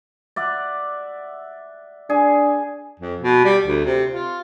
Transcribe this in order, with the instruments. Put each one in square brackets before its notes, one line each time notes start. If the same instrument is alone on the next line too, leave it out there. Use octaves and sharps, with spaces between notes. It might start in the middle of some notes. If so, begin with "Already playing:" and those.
[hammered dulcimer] D5 E5 F#5
[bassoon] D4 [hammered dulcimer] G#4
[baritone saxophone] F2
B2
G3
D2
C3
F4